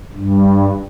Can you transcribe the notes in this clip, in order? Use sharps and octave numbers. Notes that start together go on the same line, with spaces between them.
G2